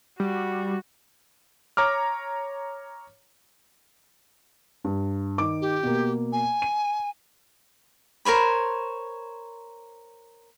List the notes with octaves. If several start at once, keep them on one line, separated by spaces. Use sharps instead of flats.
G3 F#4
C#5 A#5 D6 F6
G2
D#3 D6
G4
B2 A#3
G#5
D#7
A#4 C5 C#5 B5